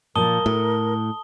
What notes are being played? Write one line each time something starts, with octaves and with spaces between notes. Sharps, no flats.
A#2 F3 A#4 A5 D#6 G7
A2 A4